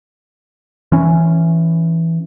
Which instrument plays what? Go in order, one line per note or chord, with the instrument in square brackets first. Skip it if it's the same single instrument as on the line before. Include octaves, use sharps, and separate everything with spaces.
[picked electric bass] E3 C#4